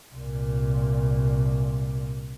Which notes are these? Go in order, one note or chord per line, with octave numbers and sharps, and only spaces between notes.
C2 A#2